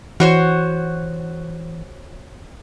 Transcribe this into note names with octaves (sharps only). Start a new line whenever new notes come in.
E3 F#4 C5 C#5